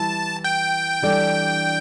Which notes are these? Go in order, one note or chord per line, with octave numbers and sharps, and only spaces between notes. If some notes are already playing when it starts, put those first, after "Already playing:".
Already playing: E3 G3 E4 A5
G5
E3 G3 D4 A4 D5